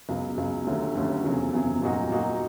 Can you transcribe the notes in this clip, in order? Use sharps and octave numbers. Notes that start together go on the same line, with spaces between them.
C#2 B2 F#3
C#2 B2 F#3
D#2 D3 F#3 A3 C#4
D#2 D3 F#3 A3 C#4
F1 E2 C#3 F#3
F1 E2 C#3 F#3
A#2 F#3 A#3 D#4 F#4
A#2 F#3 A#3 D#4 F#4